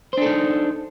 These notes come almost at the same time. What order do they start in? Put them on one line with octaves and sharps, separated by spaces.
C5 D4 A4 D#4